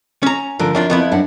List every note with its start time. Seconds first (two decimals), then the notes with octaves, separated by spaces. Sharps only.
0.23 C#4 A#5
0.59 D3 F3 A#4
0.75 F#2 D4 F4
0.90 F2 B3 E4
1.12 F#2 D4 F#5